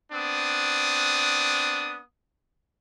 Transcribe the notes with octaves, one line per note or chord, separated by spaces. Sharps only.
B3 C4 D4 D#6